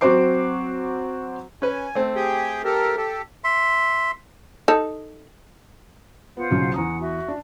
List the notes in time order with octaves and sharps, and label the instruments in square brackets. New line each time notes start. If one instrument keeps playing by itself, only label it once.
[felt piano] F#3 C4 F#4 C5 D6 C7
[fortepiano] C#4 B4 [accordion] G#5
[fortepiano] A3 C4
[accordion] G4 G#4 G5
G4 A4 A#4
G4 A4
[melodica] E5 C6
[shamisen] D#4 A4
[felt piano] B3 [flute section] F4 C5 F#5
[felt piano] B1 C#3 F#3
[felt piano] E2 A#5 D#6 [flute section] F#5
[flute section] F#4 E5
[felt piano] D4